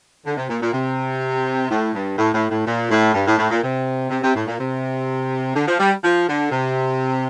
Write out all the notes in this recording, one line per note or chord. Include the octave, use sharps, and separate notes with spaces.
D3
C3
A#2
A#2
C3
A2
G2
A2
A2
A2
A#2
A2
G2
A2
A2
A#2
C3
C3
C3
A2
A#2
C3
D3
F3
G3
F3
D3
C3